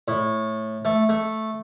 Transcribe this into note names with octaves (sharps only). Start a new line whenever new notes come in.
A2
A3
A3